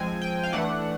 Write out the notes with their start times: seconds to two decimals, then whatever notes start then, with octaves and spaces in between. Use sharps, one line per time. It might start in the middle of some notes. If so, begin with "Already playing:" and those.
Already playing: F3 G#3 C4 G#5
0.21 G5
0.43 F5
0.53 E3 A3 D4 F#5